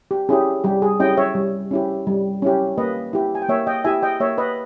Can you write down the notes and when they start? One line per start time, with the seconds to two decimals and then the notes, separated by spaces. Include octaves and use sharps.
0.11 G4
0.29 C#4 E4 G4 G#4
0.64 G3 G4
0.82 G#4
1.00 C#4 E4 G4 D#5 G5
1.17 C#5 E5
1.35 G3
1.71 C#4 E4 G4
2.07 G3
2.42 C#4 E4 G4
2.78 A#3 B4 D#5
3.13 E4 G4
3.35 G#5
3.42 G5
3.49 A#3 C#5 E5
3.67 D#5 G5
3.85 E4 G4 E5 G#5
4.02 D#5 G5
4.20 A#3 C#5 E5
4.38 B4 D#5